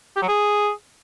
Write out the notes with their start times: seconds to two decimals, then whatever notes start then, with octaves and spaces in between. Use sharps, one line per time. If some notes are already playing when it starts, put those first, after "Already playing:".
0.16 G4
0.22 F#3
0.28 G#4